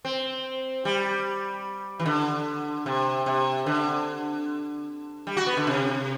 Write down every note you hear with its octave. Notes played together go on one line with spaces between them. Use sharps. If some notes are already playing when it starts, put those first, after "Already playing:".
C4
G3
E3
D3
C3
C3
D3
G3
F#4
B3
D3
C3